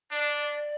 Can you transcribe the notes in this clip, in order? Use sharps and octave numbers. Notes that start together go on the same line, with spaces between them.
D4 D5